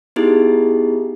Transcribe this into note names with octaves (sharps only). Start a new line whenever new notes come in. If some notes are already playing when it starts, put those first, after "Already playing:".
B3 D#4 E4 G4 G#4